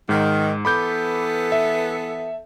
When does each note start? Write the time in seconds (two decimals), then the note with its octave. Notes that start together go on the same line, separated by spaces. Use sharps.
0.09 G#2 D#3
0.65 E3 B3 A4 B5 D6 G6
1.52 E5